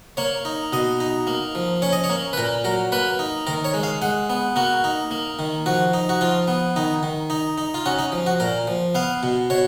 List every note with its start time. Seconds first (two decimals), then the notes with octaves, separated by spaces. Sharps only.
0.17 A#3 C#5
0.45 D#4
0.73 B2 D#5
1.00 D#4
1.27 A#3
1.55 F3
1.82 C#4 C#5
1.93 D#5
2.04 C#5
2.09 A#3
2.33 B4
2.37 A#2 A#4
2.64 F#3 A#4
2.92 A#3 B4
3.19 D#4
3.47 D#3 A#4
3.64 C#5
3.74 G#3
3.83 F5
4.02 G#3 F#5
4.30 B3
4.56 A#3 F#4
4.84 D#4
5.11 A#3
5.39 D#3
5.66 F3 F#4
5.93 D#4
6.09 F#4
6.21 F3 F4
6.48 B3
6.76 D#3 D#4
7.03 D#3
7.30 D#4
7.58 D#4
7.74 F4
7.86 C#4 F#4
7.99 D#4
8.12 F3
8.26 F#4
8.40 A#2 A#4
8.67 F3
8.95 B3 F5
9.23 B2
9.50 B2 C#5